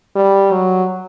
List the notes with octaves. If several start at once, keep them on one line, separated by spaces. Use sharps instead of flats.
G3
F#3